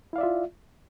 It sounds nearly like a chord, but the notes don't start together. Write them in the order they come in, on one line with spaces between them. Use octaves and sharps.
E4 F5 D5 E5 F4